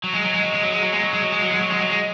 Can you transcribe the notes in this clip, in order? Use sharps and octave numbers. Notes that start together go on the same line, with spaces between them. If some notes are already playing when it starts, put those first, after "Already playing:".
F#3
G#3
F#3
G#3
F#3
G#3
F#3
G#3
F#3
G#3
F#3
G#3
F#3
G#3
F#3
G#3
F#3
G#3
F#3
G#3